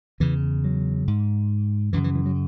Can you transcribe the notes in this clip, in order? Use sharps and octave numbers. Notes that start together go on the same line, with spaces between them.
E2 C#3 E3
F#3
G#2
F#2 C#3 E3
E3
E3
F#3